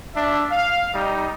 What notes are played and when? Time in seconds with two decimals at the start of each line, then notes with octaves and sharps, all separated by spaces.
0.15 D4 E5
0.51 F5
0.94 G3 D#4